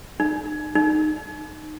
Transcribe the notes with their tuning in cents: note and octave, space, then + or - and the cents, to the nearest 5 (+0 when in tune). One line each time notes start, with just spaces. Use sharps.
D#4 -35
D#4 -15